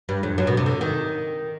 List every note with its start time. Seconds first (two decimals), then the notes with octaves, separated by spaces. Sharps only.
0.09 G2
0.23 F2
0.38 F#2
0.47 B2
0.57 C3
0.66 D3
0.81 D#3